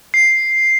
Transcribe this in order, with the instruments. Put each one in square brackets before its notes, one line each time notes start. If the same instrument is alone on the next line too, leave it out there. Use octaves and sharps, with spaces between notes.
[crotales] C7